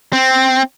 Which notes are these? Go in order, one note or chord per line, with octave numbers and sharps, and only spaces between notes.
C4